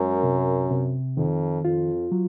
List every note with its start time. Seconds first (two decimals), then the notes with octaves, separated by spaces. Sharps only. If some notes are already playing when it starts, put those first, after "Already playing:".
Already playing: F#2 G#3 A#4
0.23 C3
0.71 C3
1.17 F2 D#3
1.65 F2 F4
2.12 F#3